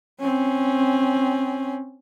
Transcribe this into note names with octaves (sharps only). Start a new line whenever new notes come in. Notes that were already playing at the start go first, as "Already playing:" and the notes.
C4 C#4